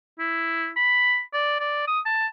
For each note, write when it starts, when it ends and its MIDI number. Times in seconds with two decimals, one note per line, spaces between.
0.19 0.70 64
0.77 1.21 83
1.33 1.58 74
1.60 1.83 74
1.88 2.00 87
2.05 2.27 81